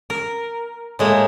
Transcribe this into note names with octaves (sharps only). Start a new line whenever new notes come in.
A#4
A2 G#3 A#3